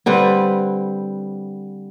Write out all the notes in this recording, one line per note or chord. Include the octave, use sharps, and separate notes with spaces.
D3 G3 C4 B4